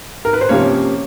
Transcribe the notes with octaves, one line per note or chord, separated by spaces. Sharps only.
A#4
B4
C5
C3 F3 A#3 C#4 C#5